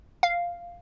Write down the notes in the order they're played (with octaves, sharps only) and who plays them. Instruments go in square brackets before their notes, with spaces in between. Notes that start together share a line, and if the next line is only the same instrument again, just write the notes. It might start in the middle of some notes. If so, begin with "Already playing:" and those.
[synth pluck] F5